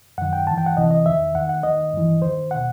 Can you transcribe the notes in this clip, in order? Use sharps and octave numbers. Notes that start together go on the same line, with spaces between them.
F#2 D#3 F#5
G5
G2 E3 A5
G5
F#5
C2 C3 E3 D#5
D#5
E2 D#3 E5
D#2 D#3 F#5
F#5
D#2 D#3 D#5
G2 E3
D#2 D#3 C5
B2 F#5